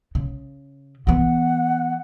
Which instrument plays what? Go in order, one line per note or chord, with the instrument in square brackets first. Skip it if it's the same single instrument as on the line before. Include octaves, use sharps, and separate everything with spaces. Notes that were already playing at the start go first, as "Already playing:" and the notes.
[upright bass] C#3
[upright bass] E3 B3 [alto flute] F#5